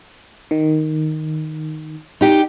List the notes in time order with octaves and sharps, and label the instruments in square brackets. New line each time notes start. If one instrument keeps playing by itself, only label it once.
[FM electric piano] D#3
[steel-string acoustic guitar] D#4 G4